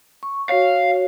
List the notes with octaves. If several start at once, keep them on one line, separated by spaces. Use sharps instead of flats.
C#6
F#4 C#5 F5